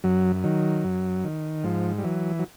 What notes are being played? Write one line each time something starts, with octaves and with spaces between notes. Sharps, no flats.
F#2 F#3
D#3 F#3
F#2
D#3
G#2 F3
G3
E3 F#3
F#3